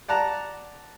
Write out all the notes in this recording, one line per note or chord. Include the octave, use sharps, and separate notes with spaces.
D5 F#5 A5 A#5